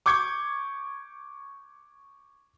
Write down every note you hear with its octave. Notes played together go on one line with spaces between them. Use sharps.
C#6 D6 G6 G#6 C#7